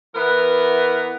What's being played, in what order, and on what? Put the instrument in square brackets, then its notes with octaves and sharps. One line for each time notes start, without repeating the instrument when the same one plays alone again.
[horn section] E3 B3 A#4 B4